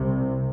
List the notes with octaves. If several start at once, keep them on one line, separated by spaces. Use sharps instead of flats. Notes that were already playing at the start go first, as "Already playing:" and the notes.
Already playing: C2 C3